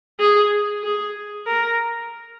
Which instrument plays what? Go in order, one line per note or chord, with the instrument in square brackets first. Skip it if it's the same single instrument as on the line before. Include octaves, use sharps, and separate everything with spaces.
[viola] G#4
G#4
A#4